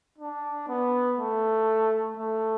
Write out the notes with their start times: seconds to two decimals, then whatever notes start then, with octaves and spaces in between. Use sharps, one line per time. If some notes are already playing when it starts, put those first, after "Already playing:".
0.18 D4
0.68 B3
1.18 A3
2.17 A3